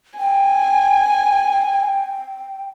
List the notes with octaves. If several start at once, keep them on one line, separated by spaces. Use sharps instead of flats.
G5 G#5